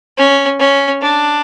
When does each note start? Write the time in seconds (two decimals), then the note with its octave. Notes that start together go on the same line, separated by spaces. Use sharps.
0.18 C#4
0.60 C#4
1.01 D4